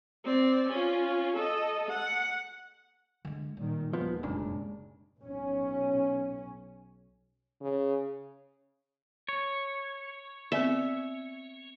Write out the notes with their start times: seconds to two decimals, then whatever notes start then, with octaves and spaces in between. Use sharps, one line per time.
0.25 C4 D5
0.69 C#4 F4
1.36 A4 D#5
1.89 F#5
3.25 D3 G#3
3.57 A#2 D#3 G3
3.93 D#2 F3 G#3 B3
4.23 F1 F#2 A#2 C#3 D4
5.21 B1 C#4
7.61 C#3
9.29 C#5
10.52 B3 C4 D5 E5